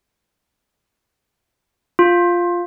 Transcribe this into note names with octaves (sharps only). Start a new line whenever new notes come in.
F4